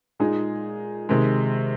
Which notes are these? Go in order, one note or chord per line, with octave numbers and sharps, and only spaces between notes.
A#2 G#3 D#4 G#4
C3 D#3 G#3